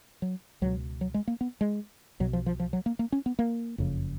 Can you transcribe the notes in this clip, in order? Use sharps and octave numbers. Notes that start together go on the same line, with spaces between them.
F#3
C#2 B2 F#3
F#3
G#3
A#3
B3
G#3
B1 B2 F#3
F3
F3
F3
F#3
A#3
A#3
C#4
B3
A#3
F#1 F2 C#3